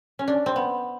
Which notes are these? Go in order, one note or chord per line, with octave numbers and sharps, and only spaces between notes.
C#4
D4
C4
B3